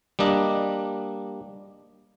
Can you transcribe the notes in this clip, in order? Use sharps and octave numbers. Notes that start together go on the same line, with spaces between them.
G3 A#3 D4 D#5